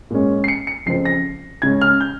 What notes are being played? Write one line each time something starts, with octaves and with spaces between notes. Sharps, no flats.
A#2 G#3 C#4
C7
C#7
C#7
F2 C#3 F3 C4 C7
A#6
C#3 G#3 C#4 G#6
F6
G6